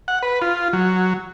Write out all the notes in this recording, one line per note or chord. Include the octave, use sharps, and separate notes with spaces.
F#5
B4
F4
F#3